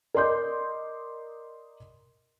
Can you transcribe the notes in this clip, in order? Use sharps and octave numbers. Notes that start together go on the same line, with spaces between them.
A#4 D5 D#5 C6 D6 G6